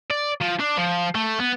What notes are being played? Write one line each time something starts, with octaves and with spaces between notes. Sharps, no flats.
D5
F3
D4
F3
A3
B3